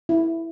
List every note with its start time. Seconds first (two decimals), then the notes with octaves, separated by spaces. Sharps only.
0.09 E4